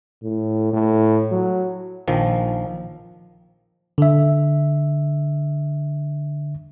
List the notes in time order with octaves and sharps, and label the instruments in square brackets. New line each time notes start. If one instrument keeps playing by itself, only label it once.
[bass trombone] A2
A2
F#3
[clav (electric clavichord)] A#1 D#3 F3
[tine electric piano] D3 E5